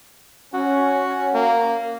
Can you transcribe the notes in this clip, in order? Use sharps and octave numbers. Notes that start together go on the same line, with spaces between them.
C#4 F#4
A#3